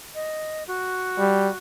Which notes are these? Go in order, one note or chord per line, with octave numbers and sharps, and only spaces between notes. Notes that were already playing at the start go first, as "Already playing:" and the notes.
D#5
F#4
G3